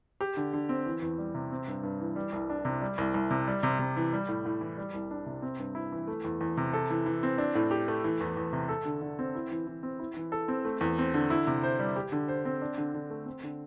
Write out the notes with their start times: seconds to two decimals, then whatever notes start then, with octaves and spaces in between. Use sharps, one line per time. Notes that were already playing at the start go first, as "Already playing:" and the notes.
0.21 G4
0.37 D3
0.53 D3
0.69 C4
0.86 E3
1.02 E2
1.18 G3
1.35 C3
1.52 C4
1.68 G2
1.83 G2
2.00 E3
2.16 G3
2.32 C2
2.50 D4
2.65 C3
2.82 G3
2.98 C2
3.14 C2
3.30 C3
3.48 G3
3.63 C3
3.79 C3
3.97 E3
4.13 G3
4.29 A2
4.45 A2
4.61 E3
4.78 G3
4.94 C2
5.11 D4
5.26 C3
5.42 C4
5.59 G2
5.75 E4
5.92 E3
6.08 A3
6.24 E2
6.41 E2
6.57 C3
6.73 A4
6.90 E3
7.06 E3
7.23 C4
7.38 D4
7.55 A2
7.71 G4
7.88 A3
8.04 E3
8.21 E2
8.37 E2
8.53 C3
8.69 A4
8.85 D3
9.02 D3
9.19 C4
9.35 E4
9.51 E3
9.67 E3
9.83 C4
9.99 E4
10.17 E3
10.32 A4
10.48 C4
10.65 A3
10.81 E2
10.98 C4
11.14 D3
11.30 E4
11.47 C3
11.63 C5
11.79 G3
11.96 G4
12.12 D3
12.28 C5
12.45 C4
12.62 D4
12.78 D3
12.94 D3
13.10 A3
13.26 C4
13.43 D3